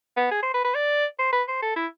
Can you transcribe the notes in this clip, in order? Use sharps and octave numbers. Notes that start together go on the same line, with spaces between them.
B3
G#4
C5
B4
B4
D5
C5
B4
C5
A4
E4